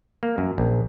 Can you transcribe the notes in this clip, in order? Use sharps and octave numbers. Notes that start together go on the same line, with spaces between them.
A#3
F#2
A#1